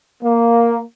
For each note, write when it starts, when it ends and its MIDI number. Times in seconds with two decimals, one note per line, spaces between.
0.23 0.79 58